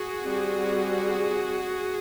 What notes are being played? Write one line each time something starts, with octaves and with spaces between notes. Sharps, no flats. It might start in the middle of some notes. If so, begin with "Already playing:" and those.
Already playing: F#4 G#4
G3 C4